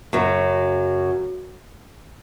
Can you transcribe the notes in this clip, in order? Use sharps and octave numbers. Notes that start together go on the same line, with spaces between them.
F#2 C#3 F#3